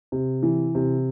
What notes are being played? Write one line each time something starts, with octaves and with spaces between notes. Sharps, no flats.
C3
E3
C3